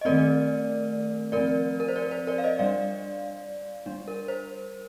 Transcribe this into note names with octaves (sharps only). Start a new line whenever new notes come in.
D#5
D#3 A3 C4 A#4 D5
F3 C4 A#4 D5
A#4
C5
A#4 D5
A#4
C5
A#4 D5
F5
C5 D#5
G3 D4 D5 F5
G3 D4
A#4
C5